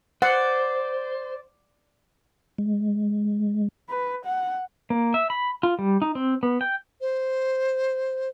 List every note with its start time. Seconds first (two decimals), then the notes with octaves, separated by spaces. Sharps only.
0.22 C5 D5 F#5
2.58 G#3
3.89 B4
4.25 F#5
4.90 A#3
5.14 E5
5.30 B5
5.63 F4
5.79 G3
6.02 D#4
6.15 C4
6.43 B3
6.61 G5
7.01 C5